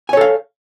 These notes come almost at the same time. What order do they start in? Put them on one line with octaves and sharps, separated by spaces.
G#5 C#5 A4 F5